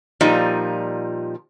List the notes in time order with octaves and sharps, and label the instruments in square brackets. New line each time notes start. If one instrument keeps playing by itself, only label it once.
[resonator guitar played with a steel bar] A#2 F3 G3 D#4